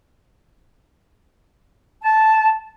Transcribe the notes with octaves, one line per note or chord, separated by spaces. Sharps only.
A5